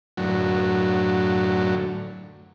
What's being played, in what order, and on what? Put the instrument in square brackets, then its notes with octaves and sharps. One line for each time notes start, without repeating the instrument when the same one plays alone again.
[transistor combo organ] F#2 A2 D3 F#3